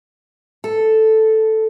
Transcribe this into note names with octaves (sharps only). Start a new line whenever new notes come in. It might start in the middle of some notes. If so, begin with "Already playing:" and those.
A4